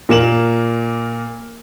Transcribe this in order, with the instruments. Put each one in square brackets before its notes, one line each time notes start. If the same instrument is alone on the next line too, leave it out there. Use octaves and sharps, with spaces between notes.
[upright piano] A#2 A#3 E7 F#7